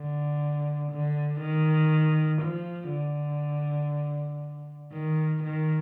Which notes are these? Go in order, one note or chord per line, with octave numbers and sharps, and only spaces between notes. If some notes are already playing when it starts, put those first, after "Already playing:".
Already playing: D3
D3
D#3
F3
D3
D#3
D#3